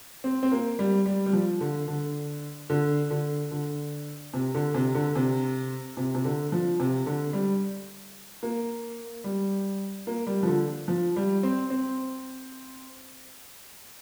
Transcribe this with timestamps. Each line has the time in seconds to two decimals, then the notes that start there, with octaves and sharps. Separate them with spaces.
0.24 C4
0.43 C4
0.52 A#3
0.79 G3
1.06 G3
1.26 G3
1.33 F3
1.61 D3
1.88 D3
2.70 D3
3.10 D3
3.51 D3
4.34 C3
4.55 D3
4.74 C3
4.95 D3
5.16 C3
5.97 C3
6.15 C3
6.25 D3
6.52 F3
6.80 C3
7.06 D3
7.33 G3
8.43 A#3
9.24 G3
10.07 A#3
10.27 G3
10.43 F3
10.48 D3
10.88 F3
11.16 G3
11.43 C4
11.70 C4